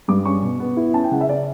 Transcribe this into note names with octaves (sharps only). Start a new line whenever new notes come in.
G2 D6
C#4 C#6
B2
B3
E4
C#4 A5
G5
C#3 F#5
E5
C#4 D5